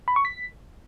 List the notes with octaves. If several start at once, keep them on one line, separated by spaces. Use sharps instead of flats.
B5
C#6
B6